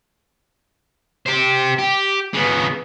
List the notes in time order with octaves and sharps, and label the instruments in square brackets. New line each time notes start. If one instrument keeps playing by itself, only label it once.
[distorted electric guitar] G4 C5
G4
C#3 B3